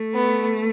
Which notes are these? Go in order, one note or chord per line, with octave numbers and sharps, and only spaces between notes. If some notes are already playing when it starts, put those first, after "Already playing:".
Already playing: A3
B3